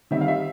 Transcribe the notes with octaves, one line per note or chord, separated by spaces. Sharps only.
D#3 G3 C4 E5
F5
E5